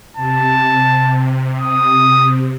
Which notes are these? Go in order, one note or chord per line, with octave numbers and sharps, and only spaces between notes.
C3 A5
D#6